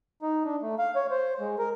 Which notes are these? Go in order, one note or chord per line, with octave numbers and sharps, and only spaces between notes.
D#4
D4
A3
F5
C#5
C5
G#3
A#4